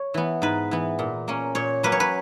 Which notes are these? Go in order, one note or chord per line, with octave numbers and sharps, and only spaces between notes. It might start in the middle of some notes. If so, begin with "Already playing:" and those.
Already playing: C#5
E3 B3
G#2 B4
E3 B3
A#2
A#3 C#4
A#2 C#5
F#3 A#3 C#4 B4
C#5
B4